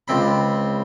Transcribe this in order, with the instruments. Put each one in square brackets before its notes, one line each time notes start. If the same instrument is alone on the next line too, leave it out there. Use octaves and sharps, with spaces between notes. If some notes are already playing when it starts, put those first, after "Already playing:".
[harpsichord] C#2 C4 B5